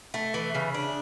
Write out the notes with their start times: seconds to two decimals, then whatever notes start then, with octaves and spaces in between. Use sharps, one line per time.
0.14 A3
0.34 E3
0.55 C#3
0.74 D4